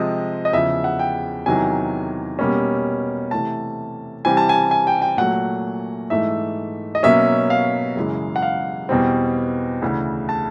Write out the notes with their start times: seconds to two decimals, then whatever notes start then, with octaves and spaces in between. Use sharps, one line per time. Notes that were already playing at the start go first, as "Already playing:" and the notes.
Already playing: C3 F3 G#3 C4 D#5
0.45 D#5
0.53 E2 C#3 F3 E5
0.84 F#5
0.99 G5
1.46 E2 C3 D#3 F#3 G#5
2.39 B2 G3 A#3 C#4
3.31 C3 E3 A3 A5
4.25 C3 E3 G3 C4 G#5
4.37 A5
4.49 G#5
4.71 G#5
4.87 G5
5.02 G5
5.17 A#2 F#3 A3 F#5
6.10 G#2 E3 A3 E5
6.95 D#5
7.03 B2 F#3 A#3 C#4 E5
7.50 F5
7.96 F#2 C#3 E3 G#3
8.36 F#5
8.42 F5
8.89 E2 B2 G3 C4
9.82 D2 C#3 E3
10.29 A5